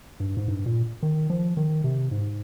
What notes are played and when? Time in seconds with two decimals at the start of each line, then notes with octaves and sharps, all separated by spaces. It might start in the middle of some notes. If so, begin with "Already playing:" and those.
0.20 G2
0.37 G#2
0.48 G2
0.66 A#2
1.03 D#3
1.30 F3
1.57 D#3
1.84 C3
2.11 G#2